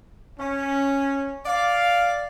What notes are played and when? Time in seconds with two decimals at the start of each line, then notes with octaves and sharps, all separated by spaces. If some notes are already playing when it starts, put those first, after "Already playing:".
0.40 C#4
1.46 D5 F5